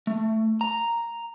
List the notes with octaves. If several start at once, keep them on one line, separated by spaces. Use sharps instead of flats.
A3
A#5